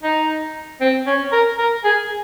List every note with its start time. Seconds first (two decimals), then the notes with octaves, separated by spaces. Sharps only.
0.03 D#4
0.81 C4
1.07 C#4
1.32 A#4
1.58 A#4
1.84 G#4